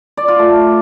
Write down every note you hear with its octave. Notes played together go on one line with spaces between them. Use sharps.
D5
F4
A3